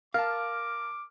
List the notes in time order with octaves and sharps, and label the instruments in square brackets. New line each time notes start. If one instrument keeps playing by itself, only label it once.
[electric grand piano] A#4 A5 [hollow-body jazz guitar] F5 [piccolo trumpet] D6 [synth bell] F6